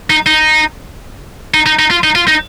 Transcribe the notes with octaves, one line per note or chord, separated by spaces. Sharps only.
D#4
D#4
D#4
D#4
D#4
F4
D#4
F4
D#4